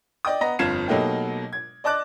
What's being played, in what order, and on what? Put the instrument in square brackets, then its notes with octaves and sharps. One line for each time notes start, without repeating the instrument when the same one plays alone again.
[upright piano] D5 D#5 G5 D#6
B3 D#5 A#5 A#6
G1 F2 F4 G#6 C7 E7
B2 F#3 A3 A#3 D#4 G4
G#6
D5 D#5 A5 D6 F#6